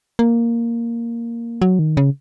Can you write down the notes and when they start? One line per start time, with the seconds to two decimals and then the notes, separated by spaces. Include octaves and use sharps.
0.19 A#3
1.62 F#3
1.79 D#3
1.97 C#3